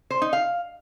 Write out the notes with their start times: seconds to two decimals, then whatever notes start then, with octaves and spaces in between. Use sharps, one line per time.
0.10 C5
0.22 D#4
0.33 F5